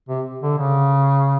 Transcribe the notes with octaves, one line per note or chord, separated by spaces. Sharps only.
C3
D3
C#3